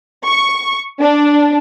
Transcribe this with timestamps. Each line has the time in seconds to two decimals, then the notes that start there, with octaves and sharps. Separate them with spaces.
0.24 C#6
1.01 D4